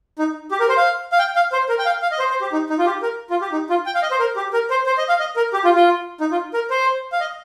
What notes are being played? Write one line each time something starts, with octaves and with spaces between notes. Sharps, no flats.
D#4
G4
A#4
C5
F5
F5
G5
F5
C5
A#4
G5
F5
F5
D#5
C5
C5
G4
D#4
D#4
F4
G4
A#4
F4
G4
D#4
F4
G5
F5
D#5
C5
A#4
G4
A#4
C5
C5
D#5
F5
D#5
A#4
G4
F4
F4
D#4
F4
A#4
C5
F5
D#5